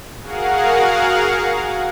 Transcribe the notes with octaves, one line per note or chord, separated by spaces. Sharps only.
F#4 G#4 A#4 F5 F#5